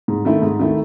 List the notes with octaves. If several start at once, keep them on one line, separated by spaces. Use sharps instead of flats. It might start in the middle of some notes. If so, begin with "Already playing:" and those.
G#2
D#3 A3 E4
G#2
D#3 A3 E4